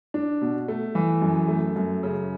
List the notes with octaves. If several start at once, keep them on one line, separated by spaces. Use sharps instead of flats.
D4
B2
A3
E3
F#2
A3
F#2
C#3